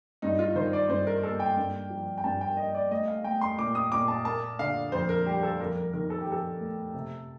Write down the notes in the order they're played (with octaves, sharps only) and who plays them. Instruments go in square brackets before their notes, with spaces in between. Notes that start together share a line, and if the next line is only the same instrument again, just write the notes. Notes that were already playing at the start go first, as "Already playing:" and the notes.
[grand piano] G2 D#4
F4
D#3 C5
D5
G2 C5
A#4
A#3 A4
G5
G2
F3
G5
G2 A5
G5
A#3 D#5
D5
A3 D#5
F5
A3 G5
C6
A#2 D6
D#6
A#2 D6
A5
A#3 A5
D3 F5
F2 C5
A#4
G3 G4
A4
F2 A#4
A#4
D#3 A#4
A4
G4
F2 A4
A3
C3